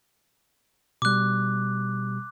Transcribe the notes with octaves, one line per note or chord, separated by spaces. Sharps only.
B2 G3 D6 F#6